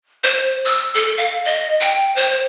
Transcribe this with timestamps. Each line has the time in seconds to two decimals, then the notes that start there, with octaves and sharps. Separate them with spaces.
0.24 C5
0.65 E6
0.95 A4
1.18 F5
1.45 D#5
1.80 G5
2.16 C5